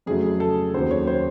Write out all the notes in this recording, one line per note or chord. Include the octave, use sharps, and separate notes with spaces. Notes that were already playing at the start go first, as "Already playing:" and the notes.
F2 C#3 F#3 A3 G#4
A4
D#2 C#3 F#3 C5
C#5
C5